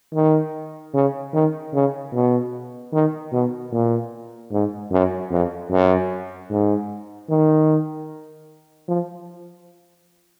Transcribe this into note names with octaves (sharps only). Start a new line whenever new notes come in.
D#3
C#3
D#3
C#3
B2
D#3
B2
A#2
G#2
F#2
F2
F#2
G#2
D#3
F3